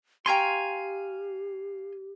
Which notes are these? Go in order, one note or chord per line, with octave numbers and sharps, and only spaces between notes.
G4 F5 G5 G#5 A#5 C6 C#6